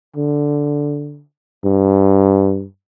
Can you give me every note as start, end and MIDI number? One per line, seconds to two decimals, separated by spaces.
0.16 1.23 50
1.65 2.65 43